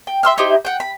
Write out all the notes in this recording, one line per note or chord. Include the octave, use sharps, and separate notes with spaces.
G5
E5 C6 E6 F6
D#4 E4 G4 C5
F#5 G5
B5